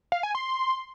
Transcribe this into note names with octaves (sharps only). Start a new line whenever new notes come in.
F5
G#5
C6